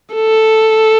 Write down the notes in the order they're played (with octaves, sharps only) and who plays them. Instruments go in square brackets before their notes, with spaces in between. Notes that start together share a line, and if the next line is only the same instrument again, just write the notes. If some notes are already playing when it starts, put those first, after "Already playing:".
[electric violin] A4